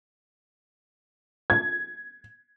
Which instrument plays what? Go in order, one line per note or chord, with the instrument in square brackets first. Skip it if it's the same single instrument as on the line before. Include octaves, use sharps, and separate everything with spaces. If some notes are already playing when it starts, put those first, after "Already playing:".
[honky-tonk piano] G#6